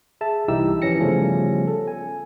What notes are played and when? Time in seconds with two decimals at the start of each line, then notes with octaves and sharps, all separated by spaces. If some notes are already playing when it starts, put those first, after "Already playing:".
0.21 G#4 E5 A5
0.48 C2 E3 D#4 E4 G4 E6
0.82 G2 E3 F3 C#4 A#6 C#7
1.00 C#3 F3 G3 A3 B3 C#4
1.67 A4
1.88 G#5